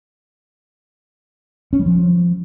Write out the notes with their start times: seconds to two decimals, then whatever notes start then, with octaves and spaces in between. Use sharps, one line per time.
1.73 C#4
1.79 G3
1.86 F3